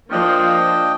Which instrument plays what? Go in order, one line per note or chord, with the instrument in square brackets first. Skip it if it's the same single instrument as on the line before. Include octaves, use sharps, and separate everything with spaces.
[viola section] F3 A#3 [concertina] D4 D#5 G5